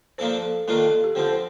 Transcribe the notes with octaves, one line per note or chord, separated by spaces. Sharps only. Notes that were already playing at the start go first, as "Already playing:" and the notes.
F3 A#3 D4 A4 C5
A4
D#3 A#3 D4 F4 A4
A4
A4
G4
D3 F3 C4 G4
C5